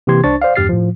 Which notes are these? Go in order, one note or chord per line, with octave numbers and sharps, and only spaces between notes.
C3 E3 A#3 G4 C6 G#6
C2 D4 C5 C#6 A6
C5 D5 F5
E2 G2 G4 F6 A6 C7
A2 F3